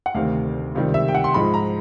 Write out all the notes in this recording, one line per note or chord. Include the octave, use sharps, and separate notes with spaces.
F#5
D2 C3 D#3 F5
C#2 C3 D#3 G3
E5
G5
F#5
C6
G#2 F3 G#3 B5
A#5